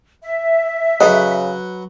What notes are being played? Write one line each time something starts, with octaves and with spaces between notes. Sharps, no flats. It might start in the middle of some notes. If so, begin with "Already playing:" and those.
E5
C#3 F#3 G#4 A4 B4 D#5 F#5